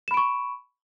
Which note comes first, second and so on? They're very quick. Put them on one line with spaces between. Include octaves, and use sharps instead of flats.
E7 B5 D7 C#6